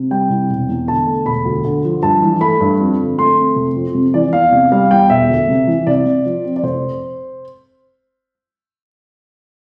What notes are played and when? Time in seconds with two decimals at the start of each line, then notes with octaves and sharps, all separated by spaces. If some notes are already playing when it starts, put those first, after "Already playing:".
Already playing: C3
0.11 G3 G5
0.30 C2
0.49 E1
0.68 E2
0.87 D3 A5
1.07 A3
1.26 E1 B5
1.45 D2
1.65 D3
1.84 F3
2.02 G2 A5
2.22 E3
2.41 A3 B5
2.60 G2
2.80 F2
2.99 D3
3.19 A3 C6
3.37 C4
3.56 F1
3.76 F2
3.94 C3
4.14 E3 D5
4.33 E2 F5
4.52 C3
4.72 G3 F5
4.91 E2 G5
5.10 E1 E5
5.29 D2
5.48 C3
5.67 E3
5.87 C2 D5
6.06 C3
6.25 F3
6.44 C4
6.56 D5
6.63 F1 C5